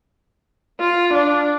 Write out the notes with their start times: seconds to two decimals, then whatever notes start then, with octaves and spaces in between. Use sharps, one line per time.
0.81 F4
1.14 D4